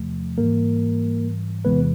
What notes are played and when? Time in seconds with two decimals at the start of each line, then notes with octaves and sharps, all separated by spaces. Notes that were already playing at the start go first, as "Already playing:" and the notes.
Already playing: E2 C3 F3 A3
0.38 G#2 E3 G3 A#3 A#4
1.65 E2 C3 E3 G#3 B3 B4